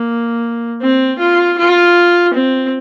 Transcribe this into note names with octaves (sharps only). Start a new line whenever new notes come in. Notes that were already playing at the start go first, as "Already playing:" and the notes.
Already playing: A#3
C4
F4
F4
C4